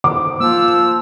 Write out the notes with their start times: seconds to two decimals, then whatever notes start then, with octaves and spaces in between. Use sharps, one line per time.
0.04 D#3 C5 D6
0.40 F3 A#3 E6